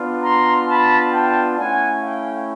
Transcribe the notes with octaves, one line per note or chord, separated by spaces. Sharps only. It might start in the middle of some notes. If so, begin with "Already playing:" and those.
Already playing: B3 D4 F4
A#5 C6
A5 B5
G5 A5
A3 C#4 E4 F#5 G#5
F5 G5